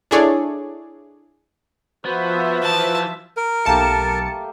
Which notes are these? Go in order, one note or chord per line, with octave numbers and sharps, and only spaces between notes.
D4 E4 G#4 A4 C#5 D5
F3 B3 F#4 B4 C5 E5
E3 A5
A#4
B1 A3 A#3 G4 A5 C#7